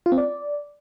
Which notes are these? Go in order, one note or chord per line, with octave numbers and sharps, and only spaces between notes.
F4
C4
D5